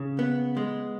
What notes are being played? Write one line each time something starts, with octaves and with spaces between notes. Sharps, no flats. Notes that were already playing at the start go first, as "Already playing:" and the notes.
Already playing: C#3
B3
G#3